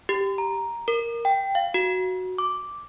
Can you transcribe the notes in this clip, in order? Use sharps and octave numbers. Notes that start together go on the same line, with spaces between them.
G4
A#5
A#4
G5
F5
F#4
D6